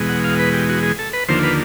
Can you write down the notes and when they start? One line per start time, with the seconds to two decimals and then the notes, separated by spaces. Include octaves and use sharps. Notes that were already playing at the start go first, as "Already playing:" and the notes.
Already playing: E2 B2 G#3
0.09 F#5
0.24 F5
0.39 B4
0.54 G4
0.69 F#4
0.83 G#4
0.99 A4
1.13 B4
1.29 D#2 D3 F3 A#3 C5
1.43 B4